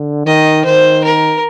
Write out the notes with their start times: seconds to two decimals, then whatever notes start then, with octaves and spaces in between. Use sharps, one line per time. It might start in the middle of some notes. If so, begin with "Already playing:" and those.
Already playing: D3
0.26 D#3 D#5
0.65 D#3 C5
1.04 A#4